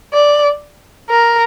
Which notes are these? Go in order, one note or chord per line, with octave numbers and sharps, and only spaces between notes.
D5
A#4